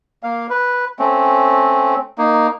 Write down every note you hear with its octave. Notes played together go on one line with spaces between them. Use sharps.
A#3 F5
B4
A3 C4 C#4
A#3 D#4